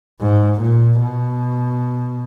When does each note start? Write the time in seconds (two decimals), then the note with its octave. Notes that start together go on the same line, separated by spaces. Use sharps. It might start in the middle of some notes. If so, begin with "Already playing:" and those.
0.21 G#2
0.62 A#2
1.02 B2